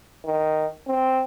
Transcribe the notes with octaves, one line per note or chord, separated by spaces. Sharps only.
D#3
C4